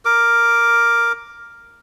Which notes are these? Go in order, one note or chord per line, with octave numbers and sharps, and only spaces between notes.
A#4 D6